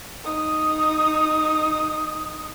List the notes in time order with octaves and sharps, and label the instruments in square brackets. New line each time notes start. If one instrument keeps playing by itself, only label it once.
[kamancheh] D#4 D#6